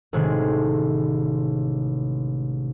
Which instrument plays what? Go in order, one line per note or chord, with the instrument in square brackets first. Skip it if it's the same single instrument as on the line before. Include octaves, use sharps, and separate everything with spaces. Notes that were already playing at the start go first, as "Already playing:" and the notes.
[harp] A1 C3 D#3 G#3